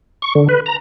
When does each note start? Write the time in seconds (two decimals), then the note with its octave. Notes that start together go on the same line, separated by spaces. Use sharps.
0.22 C#6
0.35 D3
0.49 B4
0.66 A#5